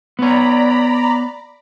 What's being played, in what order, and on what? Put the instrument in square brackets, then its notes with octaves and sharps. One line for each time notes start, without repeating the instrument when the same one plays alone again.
[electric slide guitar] B3 C#5 [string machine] D5 A#5 B5